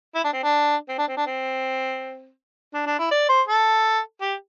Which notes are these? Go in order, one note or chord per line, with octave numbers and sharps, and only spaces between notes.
E4
D4
C4
D4
C4
D4
C4
D4
C4
D4
D4
E4
D5
C5
A4
G4